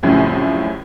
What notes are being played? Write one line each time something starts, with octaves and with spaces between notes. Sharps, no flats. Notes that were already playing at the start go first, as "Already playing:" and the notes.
C2 F#2 A2 C#3 F3